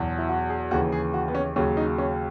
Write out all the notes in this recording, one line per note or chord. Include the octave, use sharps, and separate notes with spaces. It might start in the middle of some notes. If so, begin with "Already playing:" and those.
Already playing: E2 B2 F#3
E4
F#4
G#4
D#2 C#3 E3 F#4
G#4
F#4
B3
C#4
D#2 C#3 F#3 C#4
D#4
C#4